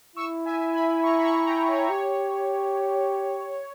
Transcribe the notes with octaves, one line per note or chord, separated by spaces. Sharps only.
E4 C#6 E6
E5 G#5
G#5 B5
A#5 C#6
B5
A#5 C#6
G5 A#5
C#5
G4 C#5